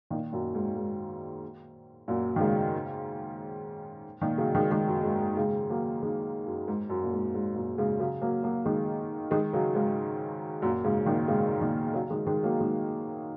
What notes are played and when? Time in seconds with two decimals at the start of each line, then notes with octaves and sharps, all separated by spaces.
0.10 A#2 D#3
0.33 F#2 A#2
0.54 G#2
0.76 G#2
2.08 F#2 A#2
2.36 D#3
2.40 G#2 C#3
4.21 A#2 D#3
4.38 C#3 F#3
4.55 D#3 G#3
4.71 D#3 G#3
4.88 F#2
5.03 G#2
5.21 G#2
5.37 G#2 C#3
5.69 F#3 A#3
6.02 D#3 G#3
6.46 F#2
6.68 G#2
6.90 F#2
7.04 A#2
7.12 G#2
7.34 G#2
7.55 F#2 A#2
7.78 G#2 C#3
7.99 C#3 F#3
8.22 F#3 A#3
8.43 F#3 A#3
8.65 D#3 G#3
9.31 D#3 G#3
9.53 C#3 F#3
9.75 G#2 C#3
10.62 F#2 A#2
10.84 G#2 C#3
11.06 A#2 D#3
11.28 G#2 C#3
11.61 A#2 D#3
11.94 C#3 F#3
12.10 D#3 G#3
12.27 D#3 G#3
12.43 F#3 A#3
12.60 D#3 G#3